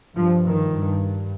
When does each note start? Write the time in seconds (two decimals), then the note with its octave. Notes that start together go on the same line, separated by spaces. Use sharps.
0.16 G2 F3
0.45 D#3
0.73 G2